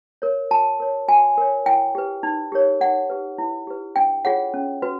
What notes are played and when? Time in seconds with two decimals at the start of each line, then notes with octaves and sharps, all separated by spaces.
0.22 A#4 C#5
0.51 F#4 A5
0.80 A#4 C#5
1.08 F#4 G#5
1.37 A#4 C#5
1.66 E4 G5
1.95 G4 B4
2.23 D#4
2.52 G4 A#4 C#5
2.81 D#4 F#5
3.10 G4 B4
3.38 E4
3.67 G4 B4
3.96 D4 G5
4.25 F4 G#4 C#5 F#5
4.54 C#4
4.82 F#4 B4